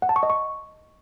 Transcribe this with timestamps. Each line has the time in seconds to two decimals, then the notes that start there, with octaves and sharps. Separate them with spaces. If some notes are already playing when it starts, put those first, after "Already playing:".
0.02 F#5
0.09 A5
0.16 C#6
0.23 D#5
0.30 C#6